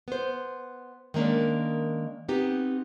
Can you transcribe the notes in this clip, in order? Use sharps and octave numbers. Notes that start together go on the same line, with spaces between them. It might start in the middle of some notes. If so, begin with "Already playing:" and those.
B3 C5
D#3 G#3 A#3 C#4 D4
B3 C4 D#4 G4